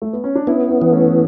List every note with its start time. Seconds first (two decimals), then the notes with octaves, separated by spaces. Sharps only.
0.02 A3
0.13 B3
0.24 C#4
0.35 D4
0.47 B3 C#4 E4
0.69 C#4 E4
0.82 E3
0.92 A3 C#4